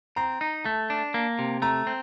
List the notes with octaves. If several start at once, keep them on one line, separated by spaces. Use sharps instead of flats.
C4 A#5
D#4
A3 A5
D4
A#3
C3
A3 A#5
C4